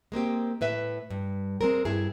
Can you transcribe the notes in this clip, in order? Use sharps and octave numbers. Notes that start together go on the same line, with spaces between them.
G#3 A#3 C4 G4
A2 B4 E5
G2
G#3 C4 A#4
G2 E4 G#4